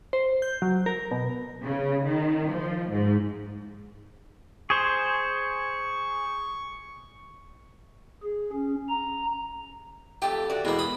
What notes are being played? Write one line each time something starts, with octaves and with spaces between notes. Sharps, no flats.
C5
G6
F#3
A#4
B2
C#3
D#3
F3
G#2
G#4 C5 C#6
G#4
C#4
A#5
F2 A3 G4 G5
F#4 D5
E2 B2 G#3 A#3
B5 D#6